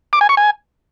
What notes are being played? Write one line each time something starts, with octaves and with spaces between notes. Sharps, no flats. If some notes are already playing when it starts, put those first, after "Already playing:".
D6
G#5
C#6
G#5